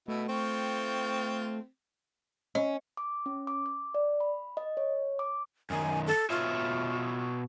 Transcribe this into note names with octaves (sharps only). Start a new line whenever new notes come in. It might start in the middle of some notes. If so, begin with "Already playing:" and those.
B2 A3 E4
C4 F4 G5 C#6
C#4 D#5
D6
C#4
D6
D6
D5
B5
D#5
C#5
D6
F#2 D#3 G#5
A4
B2 F4 C#5 E5